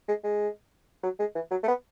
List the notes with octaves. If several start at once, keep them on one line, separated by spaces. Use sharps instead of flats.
G#3
G#3
F#3
G#3
E3
F#3
A3
B3